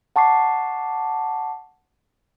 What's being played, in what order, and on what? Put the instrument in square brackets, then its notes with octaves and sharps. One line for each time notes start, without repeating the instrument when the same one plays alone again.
[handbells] F#5 A5 C#6 D6 C7